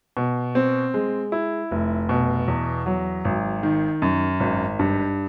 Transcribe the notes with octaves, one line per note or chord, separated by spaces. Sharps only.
B2
C4
G#3
E4
F1
B2
E2
F#3
G#1
D#3
F#2
G#1
G2